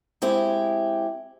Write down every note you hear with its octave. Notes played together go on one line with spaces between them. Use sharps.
G#3 C4 E4 G4